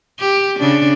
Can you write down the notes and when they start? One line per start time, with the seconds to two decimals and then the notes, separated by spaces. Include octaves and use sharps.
0.19 G4
0.60 C#3 D4